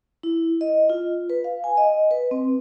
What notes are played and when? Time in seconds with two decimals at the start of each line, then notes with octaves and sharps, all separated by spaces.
0.23 E4
0.61 D#5
0.90 F4
1.30 B4
1.44 F5
1.64 G#5
1.77 D#5
2.11 B4
2.31 C4